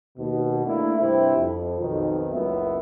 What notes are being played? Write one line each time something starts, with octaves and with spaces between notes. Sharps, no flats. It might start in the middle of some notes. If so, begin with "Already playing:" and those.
D#2 B2
A3 A#3 D4 E4
G2 C3 C4 E4
F2
B1 F2 B2 D#3
F#1 C#2 F#2 B3 E5